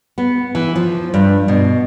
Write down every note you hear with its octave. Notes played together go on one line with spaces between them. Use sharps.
B3
E3
F3
G2
B2